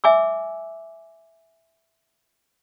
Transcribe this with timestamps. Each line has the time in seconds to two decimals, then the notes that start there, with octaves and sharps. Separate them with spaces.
0.04 E5 G#5 D6 E6